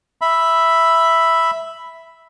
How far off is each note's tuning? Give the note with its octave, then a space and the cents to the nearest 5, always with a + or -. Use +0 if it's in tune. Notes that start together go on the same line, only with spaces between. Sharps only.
E5 +0 B5 +0